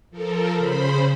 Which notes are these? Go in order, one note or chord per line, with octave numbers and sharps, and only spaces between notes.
F3 A4 A#4
C#3 C5 B5